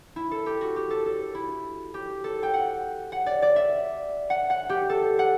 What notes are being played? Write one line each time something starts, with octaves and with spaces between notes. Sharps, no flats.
E4
A4
G4
F#4
G4
A4
A4
E4
G4
A4
G5
F#5
F#5
D5
D5
E5
F#5
F#5
G4
A4
F#5